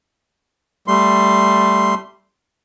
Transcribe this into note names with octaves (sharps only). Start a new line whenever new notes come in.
G3 A3 C6